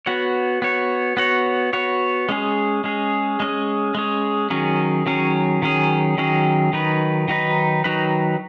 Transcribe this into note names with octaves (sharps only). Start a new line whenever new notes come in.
B3 F#4 C#5
B3 F#4 C#5
B3 F#4 C#5
B3 F#4 C#5
G#3 C#4 G#4
G#3 C#4 G#4
G#3 C#4 G#4
G#3 C#4 G#4
D#3 F#3 C#4 G#4
D#3 F#3 C#4 G#4
D#3 F#3 C#4 G#4
D#3 F#3 C#4 G#4
D#3 F#3 D#4 B4
D#3 F#3 D#4 B4
D#3 F#3 D#4 B4